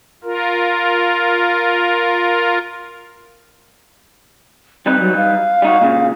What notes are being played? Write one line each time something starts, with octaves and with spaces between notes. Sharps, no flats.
F4 A#4
G3 C4 D#4 B4
F#3
F5
G3 D#4 F#4
A#2 C#3